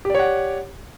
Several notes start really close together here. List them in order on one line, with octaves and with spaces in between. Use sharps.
G4 D5 C#5 F#5